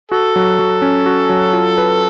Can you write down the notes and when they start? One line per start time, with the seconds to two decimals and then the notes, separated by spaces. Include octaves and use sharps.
0.11 F#4 A4
0.36 F#3
0.59 F#3
0.82 C#4
1.06 F#4
1.29 F#3
1.53 F4
1.78 B4